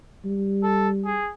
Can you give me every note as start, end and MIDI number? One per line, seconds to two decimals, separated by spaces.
0.25 1.21 55
0.63 0.88 69
1.05 1.31 68